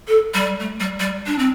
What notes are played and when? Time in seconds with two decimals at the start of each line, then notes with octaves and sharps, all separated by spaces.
0.08 A4
0.34 G3
0.60 A3
0.80 G3
1.00 G3
1.27 D4
1.39 C4